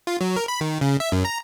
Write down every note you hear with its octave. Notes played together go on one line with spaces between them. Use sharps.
F4
F#3
A#4
B5
D#3
C#3
E5
F#2
A#5